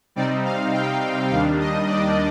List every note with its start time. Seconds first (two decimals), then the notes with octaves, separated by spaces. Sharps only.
0.16 C3 G3 C4 D#4 D5
0.44 F5
0.73 G5
1.31 D#2 D#3 G3 D4 F5
1.59 D#5
1.88 D5